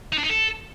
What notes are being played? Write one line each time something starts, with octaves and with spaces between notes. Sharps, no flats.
D#4
D4
D#4
A4